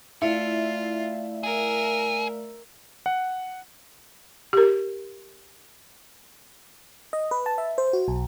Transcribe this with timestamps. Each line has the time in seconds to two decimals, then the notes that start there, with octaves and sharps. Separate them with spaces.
0.22 A3 E4 F4 D5 F5
1.43 G#4 A#4 E5
3.06 F#5
4.53 G4 A#4
7.13 D#5
7.31 B4
7.46 A5
7.58 E5
7.78 C5
7.93 F#4
8.08 B1